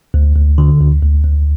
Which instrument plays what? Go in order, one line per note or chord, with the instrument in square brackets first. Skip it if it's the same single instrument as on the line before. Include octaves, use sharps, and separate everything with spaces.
[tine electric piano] D2
D2
D3
D2
D2
D2